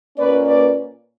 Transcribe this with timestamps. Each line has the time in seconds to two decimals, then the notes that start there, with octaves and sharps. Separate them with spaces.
0.18 A#2 A#3 C#4 B4 D5
0.47 B4 D5